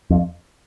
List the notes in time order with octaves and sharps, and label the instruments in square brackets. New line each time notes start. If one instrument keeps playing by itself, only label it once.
[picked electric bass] F2